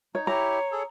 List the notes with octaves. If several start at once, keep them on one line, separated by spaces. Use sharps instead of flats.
D#4 C#5
E4 G4 C#5 A#5
G#4 A4